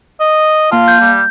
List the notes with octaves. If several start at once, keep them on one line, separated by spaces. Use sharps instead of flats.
D#5
A#3 F4 F5 A5
G6
G3